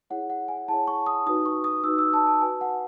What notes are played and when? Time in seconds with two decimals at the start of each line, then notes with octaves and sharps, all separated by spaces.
0.10 E4 G#4 C#5 F#5
0.30 F#5
0.48 G#5
0.68 E4 G#4 C#5 A5
0.87 C#6
1.06 D#6
1.26 D#4 F#4 B4 D#6
1.46 C#6
1.64 D#6
1.84 D#4 F#4 B4 E6
1.98 E6
2.13 A5
2.27 A5
2.41 F#4 B4 G#5
2.61 F#5